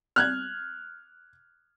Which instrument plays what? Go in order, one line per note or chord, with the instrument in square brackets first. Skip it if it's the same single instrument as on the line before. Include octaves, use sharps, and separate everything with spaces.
[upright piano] F6 F#6 G#6